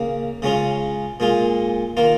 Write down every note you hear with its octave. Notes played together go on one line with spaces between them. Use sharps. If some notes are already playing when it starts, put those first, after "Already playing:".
Already playing: C#3 A#3
C#3 G#3 C#4 F4
A#2 G#3 F4
D#3 A#3 F4